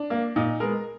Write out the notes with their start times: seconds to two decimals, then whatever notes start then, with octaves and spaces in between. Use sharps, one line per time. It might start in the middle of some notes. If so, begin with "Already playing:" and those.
Already playing: D4
0.10 A#3
0.36 A#2 D#4
0.60 G#3 B3 A#4